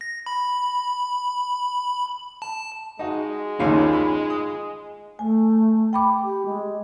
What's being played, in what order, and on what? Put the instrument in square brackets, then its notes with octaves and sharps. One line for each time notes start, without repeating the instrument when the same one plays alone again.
[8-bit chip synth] A#6
B5
A5
[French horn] G#3 [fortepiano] D#4 F#4
[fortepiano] A#1 D#2 C#4 [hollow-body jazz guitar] D#4 F4
[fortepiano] B5
D#6
[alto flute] A3 [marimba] G#5
[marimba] G5 B5 D6
[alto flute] G4
G#3